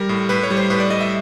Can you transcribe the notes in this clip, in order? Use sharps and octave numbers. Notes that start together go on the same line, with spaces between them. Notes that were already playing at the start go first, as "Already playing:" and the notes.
Already playing: G3 A#4
A2
A2 B4
C#5
G3
C5
A2 B4
D5
G3 D#5
E5